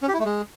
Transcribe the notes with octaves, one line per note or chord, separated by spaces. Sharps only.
C#4
G4
E4
A3
G#3